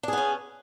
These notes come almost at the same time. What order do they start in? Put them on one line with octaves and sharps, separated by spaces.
D4 G#4 B3 C#4